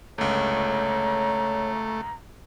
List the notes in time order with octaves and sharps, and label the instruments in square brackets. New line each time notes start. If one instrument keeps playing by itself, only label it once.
[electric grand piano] G1 C#2 [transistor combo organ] A3 [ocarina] C#5 [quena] A#5